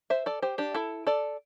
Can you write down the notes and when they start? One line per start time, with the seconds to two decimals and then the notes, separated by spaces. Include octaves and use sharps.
0.10 C5 E5
0.26 A4 D5
0.42 G4 C5
0.58 D4 G4
0.74 E4 A4
1.07 A4 D5